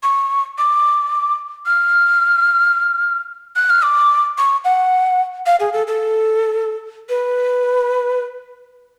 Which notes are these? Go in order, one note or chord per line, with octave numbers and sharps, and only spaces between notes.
C#6
D6
F6
F#6
F6
D6
C#6
F#5
F5
G#4
A4
A4
B4